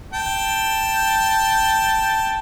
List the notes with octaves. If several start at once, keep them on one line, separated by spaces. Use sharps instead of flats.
G5 A5